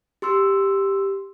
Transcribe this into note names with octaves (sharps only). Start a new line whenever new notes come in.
G4 C6 E6